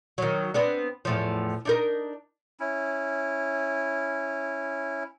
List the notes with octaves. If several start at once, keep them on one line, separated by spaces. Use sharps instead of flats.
D#3 F#3
B3 C4 D4
E2 A2 F3
D4 D#4 A#4
C#4 E4